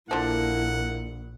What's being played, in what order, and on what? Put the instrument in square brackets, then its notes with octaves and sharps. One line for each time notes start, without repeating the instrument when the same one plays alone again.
[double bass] A#1 [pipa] D3 F3 [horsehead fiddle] A#3 E4 [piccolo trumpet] F#5